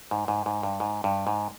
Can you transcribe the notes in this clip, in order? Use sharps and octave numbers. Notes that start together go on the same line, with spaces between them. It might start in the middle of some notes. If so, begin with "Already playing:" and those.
G#2
G#2
G#2
G2
G#2
G2
G#2